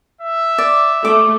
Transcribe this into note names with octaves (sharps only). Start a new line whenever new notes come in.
E5
D5
A3 D6